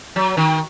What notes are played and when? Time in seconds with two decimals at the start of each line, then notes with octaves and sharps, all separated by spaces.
0.16 F#3
0.37 D#3